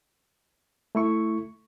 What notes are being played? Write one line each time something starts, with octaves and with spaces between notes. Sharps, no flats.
A3 E4 C#6